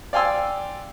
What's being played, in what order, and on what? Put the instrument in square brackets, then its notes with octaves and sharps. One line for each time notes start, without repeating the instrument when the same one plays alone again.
[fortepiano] D5 F5 G5 G#5 C6 E6